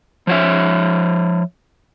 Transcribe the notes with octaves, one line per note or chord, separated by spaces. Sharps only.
F3 C#5 E5